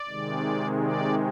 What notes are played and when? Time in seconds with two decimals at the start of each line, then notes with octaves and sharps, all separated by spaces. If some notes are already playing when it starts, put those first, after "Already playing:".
Already playing: D5
0.08 C3 D#3 G#3
0.81 D5